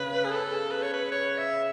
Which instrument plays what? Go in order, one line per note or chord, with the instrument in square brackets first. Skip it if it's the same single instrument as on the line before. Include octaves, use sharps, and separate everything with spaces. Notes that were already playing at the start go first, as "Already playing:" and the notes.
Already playing: [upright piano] C#3 C#4 [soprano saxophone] B4
[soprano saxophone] G#4
A4
B4
C#5
B4
C#5
E5